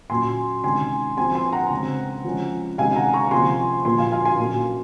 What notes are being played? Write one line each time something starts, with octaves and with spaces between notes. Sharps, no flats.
A#2 F#3 C#4 G#5 C6
C3 D#3 G#3 C#4 G#5 C6
F3 C4 G#5 C6
G#5 C6
F#5 A#5
C#3 G#3 C4
F3 G#3 C#4
C3 D#3 G#3 C#4 F5 G#5
F#5 A#5
A#5 C#6
C3 F3 A#3 C#4 G#5 C6
A#2 F3 A#3 G#5 C6
F5 G#5
F5 G#5
G#5 C6
A#2 F#3 A#3 C#4